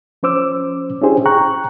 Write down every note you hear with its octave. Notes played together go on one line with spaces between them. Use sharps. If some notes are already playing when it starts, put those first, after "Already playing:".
F3 C#4 C5 D6 E6
C#4 D4 E4 G4 G#4 C5
G5 A#5 C#6 F#6